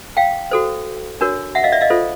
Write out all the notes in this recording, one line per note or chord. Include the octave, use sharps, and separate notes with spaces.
F5 G5
F#4 A4 C5
D4 F#4 A#4 C#5
E5 F#5
D#5 F5
D5 E5
D#5 F5
F4 A4 C5